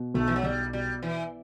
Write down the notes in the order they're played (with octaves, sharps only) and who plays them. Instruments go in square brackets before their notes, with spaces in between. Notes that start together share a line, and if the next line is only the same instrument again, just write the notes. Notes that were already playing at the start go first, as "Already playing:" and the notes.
Already playing: [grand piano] B2
[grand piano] B1 [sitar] A3
[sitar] E3
F#3
[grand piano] B1 [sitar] G3
[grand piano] B2 [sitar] G3
[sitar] E3 [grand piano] B3